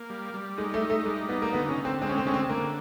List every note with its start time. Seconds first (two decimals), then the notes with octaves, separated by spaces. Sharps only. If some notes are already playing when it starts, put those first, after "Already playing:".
Already playing: A#3
0.10 G3
0.34 G3
0.58 G#3 D#4
0.74 A3
0.82 D#4
0.90 A3
1.05 G3 G#3
1.29 B3 D#4
1.42 A#3
1.53 D3 B3
1.69 C#4
1.78 D3
1.85 C4
2.01 G#3 C4
2.09 C#4
2.18 C4
2.25 D3 C#4
2.34 C4
2.49 D3 A#3